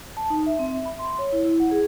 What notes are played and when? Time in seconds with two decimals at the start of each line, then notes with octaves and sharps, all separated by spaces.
0.17 A5
0.30 D#4
0.46 E5
0.59 C4
0.73 E5
0.86 B5
0.99 C6
1.19 C#5
1.32 E4
1.45 E4
1.60 F#5
1.71 G#4